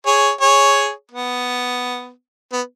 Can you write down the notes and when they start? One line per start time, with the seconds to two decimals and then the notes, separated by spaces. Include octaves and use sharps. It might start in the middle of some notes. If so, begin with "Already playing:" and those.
0.06 G#4 C#5
0.41 G#4 C#5
1.11 B3
2.53 B3